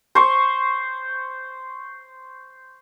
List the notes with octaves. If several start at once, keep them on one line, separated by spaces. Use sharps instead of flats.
C5 C#6